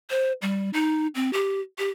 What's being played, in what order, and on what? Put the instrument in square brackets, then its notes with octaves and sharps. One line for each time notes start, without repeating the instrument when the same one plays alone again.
[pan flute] C5
G3
D#4
C4
G4
G4